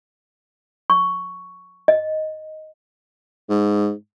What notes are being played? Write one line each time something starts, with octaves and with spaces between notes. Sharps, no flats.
C#6
D#5
G#2